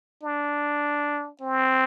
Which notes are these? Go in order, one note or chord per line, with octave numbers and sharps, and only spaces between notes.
D4
C4